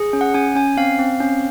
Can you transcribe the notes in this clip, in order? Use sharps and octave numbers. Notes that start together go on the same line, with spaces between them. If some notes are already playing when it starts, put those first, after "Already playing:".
Already playing: G#4
C#4
F#5
C#4 G#5
C#4 G#5
C4 F5
C4
C#4